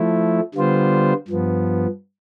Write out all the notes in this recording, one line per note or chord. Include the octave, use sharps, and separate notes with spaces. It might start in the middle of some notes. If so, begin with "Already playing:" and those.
Already playing: F3 A3 E4
D3 G3 B3 F4 C5
G2 F3 B3